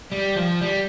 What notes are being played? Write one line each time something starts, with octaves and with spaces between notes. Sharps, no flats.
G3
F3
G3